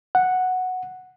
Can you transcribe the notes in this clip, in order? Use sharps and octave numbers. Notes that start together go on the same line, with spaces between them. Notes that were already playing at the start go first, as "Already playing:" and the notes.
F#5